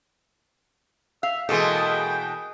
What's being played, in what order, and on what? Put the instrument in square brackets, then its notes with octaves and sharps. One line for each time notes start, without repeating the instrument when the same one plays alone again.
[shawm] E5 [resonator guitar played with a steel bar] F5
[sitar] B2 E3 [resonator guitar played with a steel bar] G#3 A#3 A4 [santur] G#4 D#5 [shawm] G5